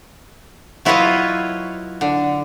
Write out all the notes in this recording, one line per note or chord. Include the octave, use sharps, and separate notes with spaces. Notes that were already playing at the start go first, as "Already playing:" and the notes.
F#3 E4 F4 B4 C#5 D#5
D3